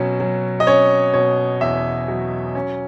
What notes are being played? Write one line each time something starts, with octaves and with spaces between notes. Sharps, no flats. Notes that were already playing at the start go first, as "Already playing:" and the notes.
Already playing: B2 F#3 C#4
F#3
D#5
C#4 C#5
B2 C#5
E2 E5
F#3
C#4